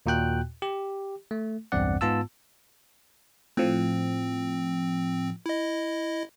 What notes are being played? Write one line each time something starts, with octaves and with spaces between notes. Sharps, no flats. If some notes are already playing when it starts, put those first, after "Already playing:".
D#2 A#2 F#4 G5 F#6
G4
A3
B1 E2 G2 C4 D5 F#5
G#2 B3 F4 A5 E6
A2 F3 C4
E4 D#5